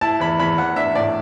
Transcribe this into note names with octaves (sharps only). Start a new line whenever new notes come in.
E4 A5
E2 B5
E2 B5
E2 F#5
D4 E5
A2 D5